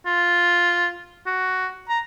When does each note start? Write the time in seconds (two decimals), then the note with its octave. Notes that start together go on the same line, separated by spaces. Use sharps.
0.06 F4
1.26 F#4
1.89 A#5